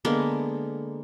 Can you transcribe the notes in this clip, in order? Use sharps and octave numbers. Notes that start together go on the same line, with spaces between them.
D3 G#3 A#3 B3